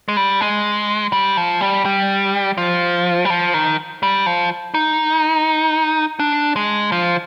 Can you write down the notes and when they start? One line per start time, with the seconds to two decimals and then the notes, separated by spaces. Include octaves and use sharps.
0.08 G#3
0.17 G3
0.41 G#3
1.13 G3
1.37 F3
1.61 G3
1.85 G3
2.58 F3
3.25 G3
3.30 F3
3.54 D#3
4.03 G3
4.26 F3
4.74 D#4
6.19 D4
6.56 G#3
6.92 F3